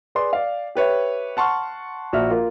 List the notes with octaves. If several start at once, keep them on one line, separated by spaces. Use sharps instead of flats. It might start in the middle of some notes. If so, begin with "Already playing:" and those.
G#4 B4 D5 C6
D5 F5
G4 B4 C#5 E5
F#5 A5 C6 C#6 F6
A#1 F#4 E5 F6
A#3 F4